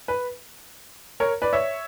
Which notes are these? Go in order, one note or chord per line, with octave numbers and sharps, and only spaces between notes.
B4
A#4 C#5
B4 D5
C#5 E5